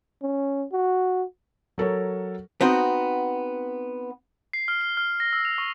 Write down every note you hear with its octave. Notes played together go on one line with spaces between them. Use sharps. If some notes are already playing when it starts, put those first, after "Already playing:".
C#4
F#4
F#3 A4 A#4 C#5
B3 C4 D#4 F#4
C7
F6
G7
F6
A#6
E6
F7
C#6